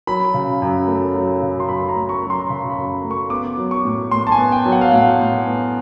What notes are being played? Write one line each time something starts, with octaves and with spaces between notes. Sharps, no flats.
F#3 B5
C#3
F#2
A3
F#3
C#3
C6
F#2 B5
A#5
A3
C#6
F#3
C6
C#3 B5
B5
F#2
A3
C#6
B3 D6
F#3
C#6
A2
A2 C6
A5
G#5
B3
G5
F#3
F#5
F5
A2 F#5
A2
B3